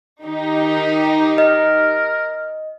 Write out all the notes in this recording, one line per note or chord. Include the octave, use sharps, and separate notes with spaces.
D#3 D#4 G4
A#4 D#5